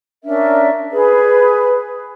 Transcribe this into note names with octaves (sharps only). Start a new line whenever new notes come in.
C#4 D4 A#4 E5
G#4 B4